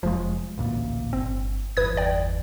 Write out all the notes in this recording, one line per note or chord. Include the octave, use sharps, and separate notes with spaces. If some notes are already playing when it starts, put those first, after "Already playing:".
F1 F3 G#3 F4
A1 D2 A#2
G1 C4
G1 E2 B4 D#6 G#6
D5 G5